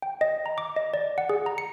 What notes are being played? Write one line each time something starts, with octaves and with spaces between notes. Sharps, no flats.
G5
D#5
A#5
D6
D#5
D5
F#5
G#4
A#5
C#7